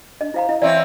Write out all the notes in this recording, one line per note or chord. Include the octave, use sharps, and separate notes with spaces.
D4 D#5
E4 C5 F5 A#5
E4 D#5
E3 C4 C#5 D5 E5